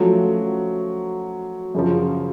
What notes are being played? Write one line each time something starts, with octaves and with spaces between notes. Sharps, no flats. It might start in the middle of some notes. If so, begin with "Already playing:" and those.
Already playing: F3 F#3 A3 C#4 F#4
F#2 C#3 F3